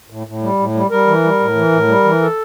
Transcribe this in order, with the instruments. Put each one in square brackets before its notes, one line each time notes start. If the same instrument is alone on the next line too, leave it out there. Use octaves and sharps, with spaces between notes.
[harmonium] A2
A2
G3
A2
G3
G3 A#4
E3
G3
A2
E3
A2
G3
E3
A4